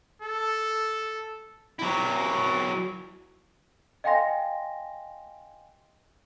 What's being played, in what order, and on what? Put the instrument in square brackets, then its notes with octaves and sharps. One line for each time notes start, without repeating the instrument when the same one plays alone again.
[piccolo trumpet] A4
[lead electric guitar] F#3 E4
[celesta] D#5 F5 G5 G#5 C6 A#6